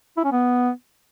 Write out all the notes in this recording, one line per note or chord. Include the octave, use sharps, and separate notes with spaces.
E4
C#4
B3